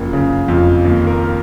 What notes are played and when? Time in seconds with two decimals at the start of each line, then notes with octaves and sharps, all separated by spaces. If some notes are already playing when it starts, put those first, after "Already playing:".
Already playing: F#1 F3 F#4
0.13 C#3
0.48 F2
0.85 D#2
1.07 A#4